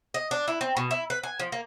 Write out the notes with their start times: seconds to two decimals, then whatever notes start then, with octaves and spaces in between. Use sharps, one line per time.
0.14 D#5
0.31 D4
0.48 E4
0.61 C4
0.77 B2
0.91 E4
1.10 B4
1.23 G#5
1.39 F3
1.52 A#3